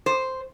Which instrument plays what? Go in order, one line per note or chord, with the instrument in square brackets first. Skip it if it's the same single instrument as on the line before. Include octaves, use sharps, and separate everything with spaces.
[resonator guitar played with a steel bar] C5